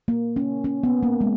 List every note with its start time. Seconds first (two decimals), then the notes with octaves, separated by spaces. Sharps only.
0.08 A#3
0.36 C#4
0.64 C#4
0.83 B3
1.03 A#3
1.21 G#3